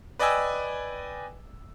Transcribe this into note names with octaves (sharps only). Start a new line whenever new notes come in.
B4 D5 D#5 G5 G#5 E6